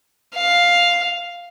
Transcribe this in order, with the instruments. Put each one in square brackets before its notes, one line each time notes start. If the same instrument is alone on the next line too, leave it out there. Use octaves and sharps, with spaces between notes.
[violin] F5